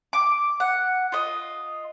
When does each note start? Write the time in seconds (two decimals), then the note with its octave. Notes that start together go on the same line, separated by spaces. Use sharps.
0.13 D6
0.60 F#5
1.12 F4 D#5